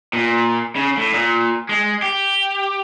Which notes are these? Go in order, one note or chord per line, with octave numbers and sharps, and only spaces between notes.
A#2
C#3
A2
A#2
G#3
G4